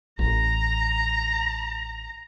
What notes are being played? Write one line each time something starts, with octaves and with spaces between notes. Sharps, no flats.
A1 A#5